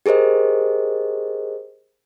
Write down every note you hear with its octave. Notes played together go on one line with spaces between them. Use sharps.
G4 G#4 A#4 C5 D#5